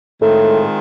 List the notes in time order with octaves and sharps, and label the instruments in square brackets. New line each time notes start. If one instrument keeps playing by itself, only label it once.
[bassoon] A2 [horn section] D#3 G#3 C4 F4 G#4